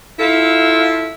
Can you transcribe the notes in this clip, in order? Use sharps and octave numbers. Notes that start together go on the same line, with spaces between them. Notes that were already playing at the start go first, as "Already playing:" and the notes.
E4 F4 A4